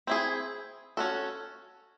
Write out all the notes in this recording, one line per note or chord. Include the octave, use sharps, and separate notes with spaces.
C4 E4 G#4
C#4 F#4 A4